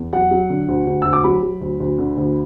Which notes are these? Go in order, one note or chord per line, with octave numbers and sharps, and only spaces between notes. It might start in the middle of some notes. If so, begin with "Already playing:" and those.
Already playing: E2
F#3 F#5
F#3
D3
D2
D2
D2 E6
D6
F#3 B5
F#3
D2
D2
D3
D2